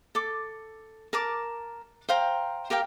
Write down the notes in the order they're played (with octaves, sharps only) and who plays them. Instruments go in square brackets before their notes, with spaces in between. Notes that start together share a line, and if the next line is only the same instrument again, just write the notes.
[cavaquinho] A4 D6
A#4 A5 D6
C5 F5 G5 A#5
G4 A#4 F5 G5